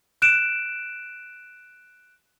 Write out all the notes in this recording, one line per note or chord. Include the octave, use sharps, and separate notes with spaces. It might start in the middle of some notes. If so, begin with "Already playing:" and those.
F#6 D7 E7